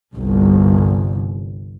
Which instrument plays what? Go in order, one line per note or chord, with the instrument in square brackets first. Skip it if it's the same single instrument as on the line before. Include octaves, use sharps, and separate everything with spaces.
[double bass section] G1 C2